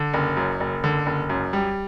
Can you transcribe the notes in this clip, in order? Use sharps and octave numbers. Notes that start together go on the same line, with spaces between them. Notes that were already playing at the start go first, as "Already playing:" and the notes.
Already playing: D3
F#1
F#2
F#1
D3
F#1
F#2
G3